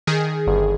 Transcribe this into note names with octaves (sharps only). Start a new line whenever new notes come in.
D#3 G#4
G1